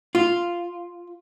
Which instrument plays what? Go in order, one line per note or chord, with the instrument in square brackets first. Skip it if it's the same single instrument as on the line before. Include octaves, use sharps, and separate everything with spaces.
[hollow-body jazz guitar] F4